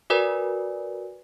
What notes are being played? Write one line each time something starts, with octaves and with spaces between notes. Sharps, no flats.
F#4 A#4 B4 D5 G#5